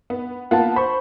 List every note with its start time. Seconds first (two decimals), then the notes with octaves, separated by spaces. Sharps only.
0.10 B3
0.51 A#3 B3 F4 F#5 A5
0.76 C5 B5 C#6